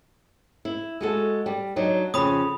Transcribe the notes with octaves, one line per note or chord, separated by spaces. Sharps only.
E4
G#3 F#4 A4
G3
F#3 D4 D#4
F2 C#3 B5 D#6